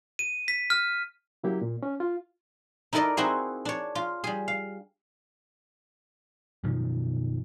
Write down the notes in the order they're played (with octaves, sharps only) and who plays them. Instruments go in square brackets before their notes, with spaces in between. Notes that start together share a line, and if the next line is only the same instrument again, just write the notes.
[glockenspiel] D#7
B6
F6
[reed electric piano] C#3 F#3 A#3 E4 G4
A#2
C#4
F4
[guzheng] D#4 E4 A4 A#4 D5 D#5
C4 D#4 E4 F#4 G#4
D4 C#5
F4
G3 G#4
F5
[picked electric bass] F#2 B2 D#3 F3